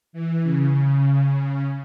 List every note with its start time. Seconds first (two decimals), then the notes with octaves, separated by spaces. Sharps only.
0.13 E3
0.43 C#3